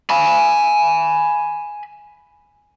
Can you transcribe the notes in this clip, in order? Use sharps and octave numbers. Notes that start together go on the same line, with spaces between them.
G#5 B5